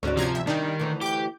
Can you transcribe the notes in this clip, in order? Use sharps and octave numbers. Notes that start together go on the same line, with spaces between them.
D2 G#2 C#4 F#4 D5
C3 F3 A#5 G#6
E2 E5
D#3 G3 D4 D#4
D2 E3
G4 D6 G6